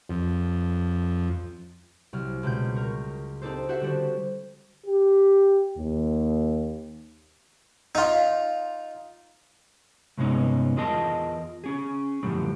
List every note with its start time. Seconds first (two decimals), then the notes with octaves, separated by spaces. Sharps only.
0.09 F2
2.13 C2 C3 F#3 F6
2.43 C#2 B2 G6
2.75 A#4 C#6
3.42 C4 D4 D#4 G4 A4 C5
3.69 F#4 G4 A4 C5 E5 F#5
3.81 D3 G3 D4 F#4
4.86 G4
5.77 D#2
7.95 D#4 F4
10.18 G2 C3 G#3 B3 C#4 D#4
10.77 E2 F4 G#4 A#4 D#5 A5
11.64 C#4 G#4
12.23 F#2 A2 D3 F3 G3